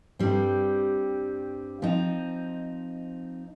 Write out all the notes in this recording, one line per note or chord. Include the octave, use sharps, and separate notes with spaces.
G2 G3 C4
F3 C4 D#4